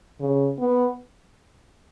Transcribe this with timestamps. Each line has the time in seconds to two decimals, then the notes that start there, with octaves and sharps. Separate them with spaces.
0.20 C#3
0.59 B3